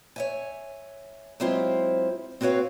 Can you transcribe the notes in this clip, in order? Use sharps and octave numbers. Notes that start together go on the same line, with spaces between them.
C#5 E5 G#5
F#3 G#3 C4 E4 F4 C5
C4 F#4 B4 C#5 F5